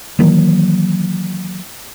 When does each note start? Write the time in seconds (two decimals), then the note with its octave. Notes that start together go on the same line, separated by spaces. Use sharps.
0.19 D#3 E3 F#3 A#3